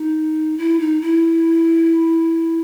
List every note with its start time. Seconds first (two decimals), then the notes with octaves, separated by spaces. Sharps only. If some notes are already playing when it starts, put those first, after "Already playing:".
Already playing: D#4
0.58 E4
0.80 D#4
1.01 E4